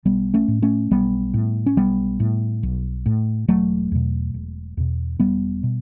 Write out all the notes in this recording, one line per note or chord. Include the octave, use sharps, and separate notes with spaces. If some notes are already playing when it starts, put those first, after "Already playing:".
B1 G3 B3
A3 C#4
A2
A3 C#4
B1 G3 B3
A2
C#4
B1 G3 B3
A2
B1
A2
E1 F#3 A3
E2 B2
E1
E2 B2
E1 G3 B3
B2